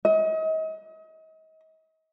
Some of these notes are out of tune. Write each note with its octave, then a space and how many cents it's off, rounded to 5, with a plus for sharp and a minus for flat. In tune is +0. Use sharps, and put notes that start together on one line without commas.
D#5 +35